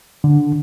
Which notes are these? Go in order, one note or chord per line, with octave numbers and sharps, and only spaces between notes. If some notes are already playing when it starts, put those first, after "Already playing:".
D3